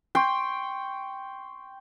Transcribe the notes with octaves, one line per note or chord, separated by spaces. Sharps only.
G5 C6 C#6